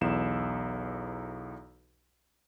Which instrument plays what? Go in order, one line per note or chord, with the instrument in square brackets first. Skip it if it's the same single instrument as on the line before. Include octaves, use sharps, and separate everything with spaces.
[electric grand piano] B1 E2 E7